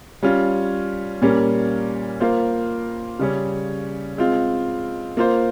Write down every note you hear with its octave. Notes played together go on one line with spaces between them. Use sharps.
G3 C#4 F4
A#2 G3 A#3 C#4
A#3 F4 C5
C#3 G3 C#4
G#3 C4 F4
A#3 F4 C5